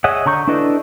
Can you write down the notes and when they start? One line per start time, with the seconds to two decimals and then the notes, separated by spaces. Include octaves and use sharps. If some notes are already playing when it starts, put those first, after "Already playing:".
0.04 G#4 C#5 D#5 E5 F#5
0.26 D3 A#5 C#6 G6
0.47 D4 E4 A4 B4 D#5